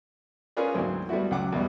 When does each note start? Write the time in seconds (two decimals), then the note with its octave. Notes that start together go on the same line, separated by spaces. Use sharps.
0.57 C#4 F4 G#4 A#4 B4 D5
0.74 D2 G#2 E3 F#3 A#3 C4
1.09 G3 A3 B3 E4 F#4
1.31 C#2 F#3 F#5 D6
1.52 E2 B2 G3